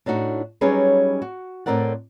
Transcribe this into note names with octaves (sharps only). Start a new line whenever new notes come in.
A2 D4 D#4 F#4
F#3 G3 C#4 D#4 G#4 B4
F#4
A2 B3 C4 A#4 D5 F#5